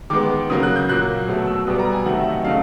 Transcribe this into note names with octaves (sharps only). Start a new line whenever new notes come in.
D#3 G#3 B3 D6
C#3 F#3 A#3 D#6
F#6
G6
A#2 F#3 A#3 F#6
B2 F#3 A3
E6
B2 G3 B3 D#6
A#5
G#5
C3 D#3 F#3 A3 F#5
E5
D#5
C#3 F#3 A3 F5